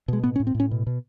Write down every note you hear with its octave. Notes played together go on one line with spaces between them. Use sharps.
B2 G#3
A2 B3
C#4
A2
C4
A2
C#4
B2
B2